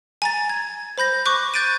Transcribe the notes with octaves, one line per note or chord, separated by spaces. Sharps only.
G#5 A#5 A6
G#6
C5 B5 G6 A#6
C#6 D6 F#6
F#6 G6 A6 D7 D#7